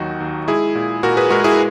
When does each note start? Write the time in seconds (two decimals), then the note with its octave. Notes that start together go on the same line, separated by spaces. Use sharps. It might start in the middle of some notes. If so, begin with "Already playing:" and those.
Already playing: D#2 D#3 F#3 D#4 F#4
0.20 D#2
0.48 G#3 E4 G#4
0.75 A#2
1.03 A#2 F#4 A#4
1.17 G#4 B4
1.30 G#3 F#4 A#4
1.44 E4 G#4